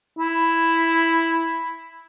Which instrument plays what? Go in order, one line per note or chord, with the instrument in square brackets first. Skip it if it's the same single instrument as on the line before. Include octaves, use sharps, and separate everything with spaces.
[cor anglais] E4